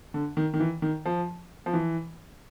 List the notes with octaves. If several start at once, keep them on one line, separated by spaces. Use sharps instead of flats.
D3
D#3
D#3
E3
D#3
F3
F3
E3